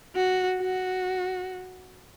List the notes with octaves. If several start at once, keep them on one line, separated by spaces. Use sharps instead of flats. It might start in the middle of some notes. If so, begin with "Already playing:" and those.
F#4
F#4